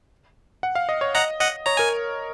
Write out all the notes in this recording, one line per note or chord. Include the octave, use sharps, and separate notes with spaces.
F#5
F5
D#5
C#5
D#5 F#5 A#5
D#5 F#5
C#5 A#5
A#4 G#5